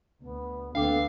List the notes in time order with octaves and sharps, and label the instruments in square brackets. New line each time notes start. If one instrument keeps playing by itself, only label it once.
[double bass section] D2 [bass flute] B3
[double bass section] D2 B3 [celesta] D4 G5 D6 [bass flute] A4 [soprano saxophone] F5